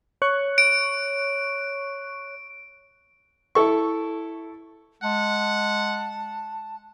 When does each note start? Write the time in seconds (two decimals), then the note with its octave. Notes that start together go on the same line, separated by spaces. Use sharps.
0.22 C#5 C#6 F#6
0.58 D7
3.55 E4 A4 C#6
5.03 G#3 F#5 A5